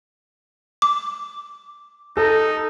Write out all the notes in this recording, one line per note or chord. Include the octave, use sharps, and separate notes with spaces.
D6
D#4 A4